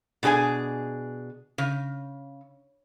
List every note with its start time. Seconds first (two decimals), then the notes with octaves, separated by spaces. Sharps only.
0.23 B2 D4 G#4 B4 G#5
1.58 C#3